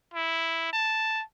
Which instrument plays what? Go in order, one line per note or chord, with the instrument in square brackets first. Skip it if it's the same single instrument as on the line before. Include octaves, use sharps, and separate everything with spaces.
[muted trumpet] E4
A5